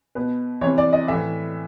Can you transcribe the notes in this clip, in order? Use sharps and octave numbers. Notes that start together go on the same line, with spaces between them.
B2 B4
C3 E3 C#5
D5
D#5
A2 E3 E5